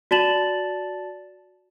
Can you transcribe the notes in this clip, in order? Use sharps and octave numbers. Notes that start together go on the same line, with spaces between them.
F#4 D5 A5 A6 E7 F#7